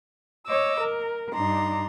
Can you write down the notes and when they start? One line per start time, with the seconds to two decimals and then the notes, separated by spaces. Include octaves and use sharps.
0.47 C#5 D#5 D6 E6
0.81 A#4
1.34 G2 D4 D#4 A#5 C6